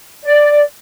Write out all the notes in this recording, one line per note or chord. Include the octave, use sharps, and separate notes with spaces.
D5